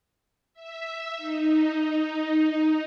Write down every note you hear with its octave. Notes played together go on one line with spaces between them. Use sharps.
E5
D#4